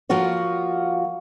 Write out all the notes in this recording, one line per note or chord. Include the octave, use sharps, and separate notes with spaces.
F3 A#3 F4 F#4 C#5